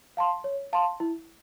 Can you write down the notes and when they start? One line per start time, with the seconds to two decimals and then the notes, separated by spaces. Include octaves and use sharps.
0.17 F5 A5 C6
0.44 C#5
0.73 F5 A5 C6
1.00 E4